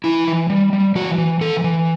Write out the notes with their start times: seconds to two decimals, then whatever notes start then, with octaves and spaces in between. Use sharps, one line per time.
0.04 E3 E4
0.28 E3
0.50 G3
0.73 G3
0.95 E3 F#4
1.18 E3
1.41 E3 A4
1.64 E3